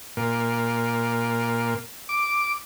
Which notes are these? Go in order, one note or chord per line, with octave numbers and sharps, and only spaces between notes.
A#2
D6